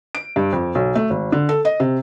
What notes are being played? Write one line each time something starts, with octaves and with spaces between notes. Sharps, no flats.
D7
G2
F2
B1
A3
G#1
D3
A4
D#5
C3